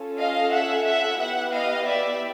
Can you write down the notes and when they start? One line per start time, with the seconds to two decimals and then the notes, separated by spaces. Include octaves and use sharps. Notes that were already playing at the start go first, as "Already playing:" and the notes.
Already playing: C#4 F4 A4
0.19 D#5 F5
0.53 E5 F#5
0.86 E5 F#5
1.20 B3 E4 G4 E5 F#5
1.53 D#5 F5
1.87 D5 E5